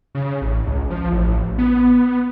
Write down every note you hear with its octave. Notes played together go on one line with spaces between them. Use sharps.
C#3
A1
C#2
F3
A1
B3